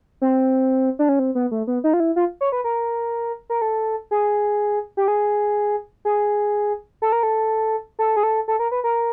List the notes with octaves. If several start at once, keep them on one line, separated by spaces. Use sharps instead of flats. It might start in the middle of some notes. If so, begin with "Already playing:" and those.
C4
D4
C#4
C4
B3
A3
B3
D#4
F4
E4
F4
C#5
B4
A#4
A#4
A4
G#4
G4
G#4
G#4
A4
A#4
A4
A4
G#4
A4
A4
A#4
B4
A#4